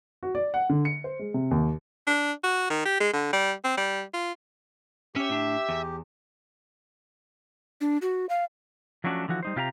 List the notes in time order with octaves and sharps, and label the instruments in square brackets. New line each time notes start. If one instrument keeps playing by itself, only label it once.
[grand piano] F#4
D5
F#5
D3
C#7
C5
G#3
C3
D#2
[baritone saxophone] D4
F#4
D#3
G4
G#3
D3
G3
C4
G3
F4
[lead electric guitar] C#4 C#5 [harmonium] G4 [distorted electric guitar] E5
[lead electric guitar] A2 D4
E2
[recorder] D4
F#4
F5
[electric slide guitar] F3 F#3 A3 C#4 D4 F#4
D3 E3 F3 F#4
G3 D#4 C5
C3 F4 G4 F5 G#5 A#5